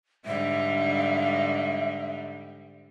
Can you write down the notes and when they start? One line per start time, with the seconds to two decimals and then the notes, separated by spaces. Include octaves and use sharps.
0.26 G#2 D3 G3 E5